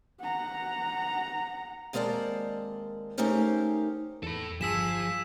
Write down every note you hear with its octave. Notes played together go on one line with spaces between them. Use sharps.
F#5 A#5
D#2 G#3 C4 A#4 D5 A5
A3 C#4 D#4 G4 A#4 C5
E2 A4 B5
G1 F3 G#4 E6 B6 E7